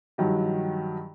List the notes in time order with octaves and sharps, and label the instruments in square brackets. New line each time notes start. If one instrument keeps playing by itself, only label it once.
[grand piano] G2 D#3 F3 F#3